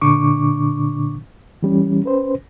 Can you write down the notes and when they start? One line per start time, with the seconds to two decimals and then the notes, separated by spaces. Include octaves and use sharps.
0.01 A#2 D3 D4 C#6 D6
1.63 E3 G3 C#4
2.04 C#4 B4 C5